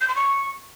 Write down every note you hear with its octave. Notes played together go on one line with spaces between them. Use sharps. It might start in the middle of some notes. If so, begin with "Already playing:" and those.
G6
C6
C#6